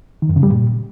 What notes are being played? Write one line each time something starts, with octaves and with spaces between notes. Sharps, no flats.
D#3
F#2
C#3
G3
A#2